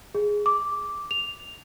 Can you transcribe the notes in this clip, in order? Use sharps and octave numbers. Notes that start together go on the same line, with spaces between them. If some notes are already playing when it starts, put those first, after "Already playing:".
G#4
D6
F7